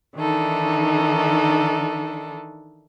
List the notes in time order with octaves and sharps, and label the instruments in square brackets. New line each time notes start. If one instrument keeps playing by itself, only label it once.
[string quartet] D#3 E3 D4 D#4 A4